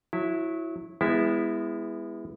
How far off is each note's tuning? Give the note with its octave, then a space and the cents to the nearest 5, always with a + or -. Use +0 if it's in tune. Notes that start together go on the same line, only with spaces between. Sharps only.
F#3 -20 E4 +0
G#3 -30 B3 +0 E4 +0